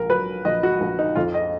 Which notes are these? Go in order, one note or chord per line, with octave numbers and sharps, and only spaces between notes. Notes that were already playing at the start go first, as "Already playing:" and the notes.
Already playing: A#1 A#4
F#3 B4
A#1 D#5
F#4
A#1
D#4
F2 F4
D#5